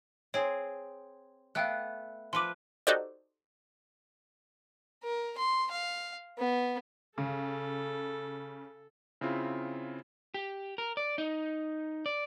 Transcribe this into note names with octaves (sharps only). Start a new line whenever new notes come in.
C4 G#4 C#5
A3 B3 F5 G5 F#6
F3 B4 C6 D6
D#4 F#4 G4 A4 C5 D5
A#4
C6
F5
B3
C#3 A4
C#3 C4 E4 F4
G4
A#4
D5
D#4
D5